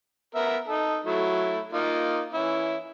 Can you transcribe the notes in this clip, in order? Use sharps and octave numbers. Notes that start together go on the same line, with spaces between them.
B3 A#4 E5
D#4 A4
F#3 A3 E4
A#3 D#4 F4
E3 C#4 E4